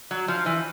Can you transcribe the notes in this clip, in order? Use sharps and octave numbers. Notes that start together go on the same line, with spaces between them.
F#3
F3
E3